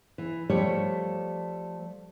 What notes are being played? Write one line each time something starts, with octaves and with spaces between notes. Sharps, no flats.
E3
F3 G3 A3 G4 C#5